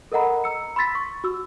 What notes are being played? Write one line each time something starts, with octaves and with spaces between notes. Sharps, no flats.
A4 A#4 D#5 F#5 A#5 B5
A#5 E6 C#7
B5 C6 E6 A6 B6
C#6
F#4 E6